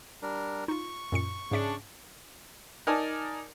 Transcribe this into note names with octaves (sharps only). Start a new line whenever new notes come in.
G3 D4 A#4
D#4 F4 C#6
F#2 A#2 C#7
G#2 C#3 D4 E5 C#7
D#4 A#4 D5 G#5 A5